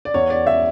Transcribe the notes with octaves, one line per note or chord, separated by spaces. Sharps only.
D5
E2 C#5
E2 D5
E5